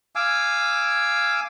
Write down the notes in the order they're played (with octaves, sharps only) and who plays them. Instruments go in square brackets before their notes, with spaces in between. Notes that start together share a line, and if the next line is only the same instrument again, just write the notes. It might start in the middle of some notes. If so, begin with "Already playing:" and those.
[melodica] F5 G#5 D6 E6